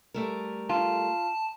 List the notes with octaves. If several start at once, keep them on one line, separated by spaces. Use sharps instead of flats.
G3 A3 A#4
F4 A5